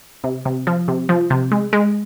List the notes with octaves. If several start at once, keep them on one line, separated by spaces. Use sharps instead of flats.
C3
C3
F3
C3
F3
C3
G#3
G#3